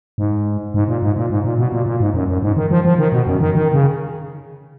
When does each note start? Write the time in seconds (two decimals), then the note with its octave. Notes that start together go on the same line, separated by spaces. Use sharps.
0.18 G#2
0.74 G#2
0.88 A#2
1.03 G#2
1.16 A#2
1.30 G#2
1.44 A#2
1.58 B2
1.72 A#2
1.86 A#2
2.00 G#2
2.14 F#2
2.28 F#2
2.42 G#2
2.57 D#3
2.71 F3
2.85 F3
2.99 D#3
3.13 B2
3.27 F#2
3.41 D#3
3.55 D#3
3.73 C#3